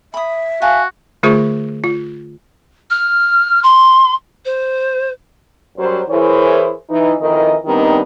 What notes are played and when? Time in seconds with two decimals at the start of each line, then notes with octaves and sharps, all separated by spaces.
0.14 E5 B5 D#6
0.62 F#4 F5 G#5 A5
1.23 D3 A3 F4 G#4 C5 C#6
1.84 F4
2.90 F6
3.63 C6
4.45 C5
5.78 F#2 F#3 G3 C5
6.09 E3 E4 G#4 A#4 C5 C#5
6.89 E3 D#4
7.19 F2 D#3 E3 E4 A#4 D#5
7.65 D#3 G3 B3 C4 D4 D#4